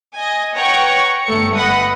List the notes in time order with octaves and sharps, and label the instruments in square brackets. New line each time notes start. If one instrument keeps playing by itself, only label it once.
[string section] D#5 G#5
B4 C#5 F#5 G5 A#5 C#6
G1 A3 A4 C#7
B4 D#5 F#5 B5 D#6